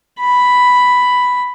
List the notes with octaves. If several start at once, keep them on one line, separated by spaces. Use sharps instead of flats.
B5